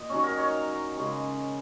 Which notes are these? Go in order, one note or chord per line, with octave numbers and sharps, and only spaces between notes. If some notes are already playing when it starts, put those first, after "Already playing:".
Already playing: A#2 D#5
D#3 F#3 C#4 C#5
A#4
C#5
C#3 G#3 C#4